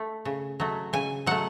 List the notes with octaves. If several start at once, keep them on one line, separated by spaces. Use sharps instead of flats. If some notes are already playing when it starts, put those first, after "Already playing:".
Already playing: A3
C#3
F#3 A3
C#3 G#5
F#3 A3 F#5